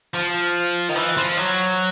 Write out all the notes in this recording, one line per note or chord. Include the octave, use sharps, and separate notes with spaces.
F3
D#3
E3
F3
F#3